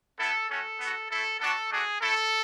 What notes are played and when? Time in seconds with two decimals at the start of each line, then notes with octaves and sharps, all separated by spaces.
0.20 B3 E4 A4
0.50 A3 C#4 F#4 A4
0.80 B3 F#4
1.11 A3 E4 A4
1.40 B3 D4 F#4 A4
1.71 A3 D4 F#4 G#4
2.01 A3 E4 A4